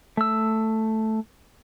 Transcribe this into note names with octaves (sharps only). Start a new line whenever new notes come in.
A3 E6